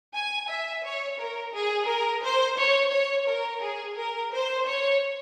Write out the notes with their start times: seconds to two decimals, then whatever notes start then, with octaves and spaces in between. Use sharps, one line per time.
0.14 G#5
0.49 E5
0.84 C#5
1.19 A#4
1.54 G#4
1.88 A#4
2.23 C5
2.57 C#5
2.92 C#5
3.27 A#4
3.61 G#4
3.96 A#4
4.32 C5
4.66 C#5